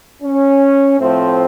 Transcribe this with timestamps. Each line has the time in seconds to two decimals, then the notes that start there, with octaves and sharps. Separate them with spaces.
0.23 C#4
0.98 A2 F3 A3 C4